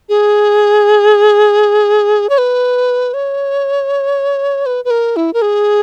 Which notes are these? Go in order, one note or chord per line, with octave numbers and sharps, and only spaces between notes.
G#4
C#5
B4
C#5
B4
B4
A#4
E4
A#4
G#4